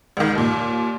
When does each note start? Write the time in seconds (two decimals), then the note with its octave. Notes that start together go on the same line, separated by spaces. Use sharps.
0.17 C#2 D#3
0.35 D#2 A#2